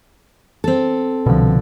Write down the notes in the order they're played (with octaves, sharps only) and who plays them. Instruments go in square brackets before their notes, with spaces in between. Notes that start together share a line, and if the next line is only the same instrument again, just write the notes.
[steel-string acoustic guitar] C4 A4
[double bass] C2 D3 [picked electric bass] B2 F3